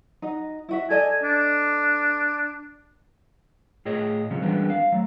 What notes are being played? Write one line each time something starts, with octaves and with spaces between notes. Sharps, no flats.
D#4 F#4 D#5
E4 F#4 E5
A4 D5 D#5 G#5
D4
A2 G#4 C#5 D#5
C#3 F3 F#3 G#3 C#4
E3 G3 G#3 B3 C#4 D4
F5
F#3 A3